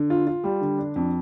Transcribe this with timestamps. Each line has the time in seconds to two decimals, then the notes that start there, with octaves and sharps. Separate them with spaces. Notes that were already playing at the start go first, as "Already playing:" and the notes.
Already playing: D3
0.10 F4
0.27 F4
0.44 G3
0.61 D3
0.78 D4
0.96 F2